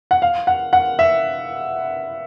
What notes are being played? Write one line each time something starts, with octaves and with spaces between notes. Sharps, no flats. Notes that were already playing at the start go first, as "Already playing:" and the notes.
F#5
F5
F#5
F#5
E5